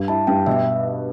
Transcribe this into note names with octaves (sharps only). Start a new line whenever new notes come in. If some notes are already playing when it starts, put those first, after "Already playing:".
Already playing: G2
E4 A5
G2 G5
B2 E5